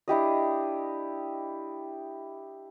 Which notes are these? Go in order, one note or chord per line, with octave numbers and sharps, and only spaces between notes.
D4 E4 G4 D#5